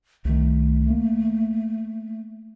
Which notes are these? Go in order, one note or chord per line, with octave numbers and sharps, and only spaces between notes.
C2 D#3 A3
A#3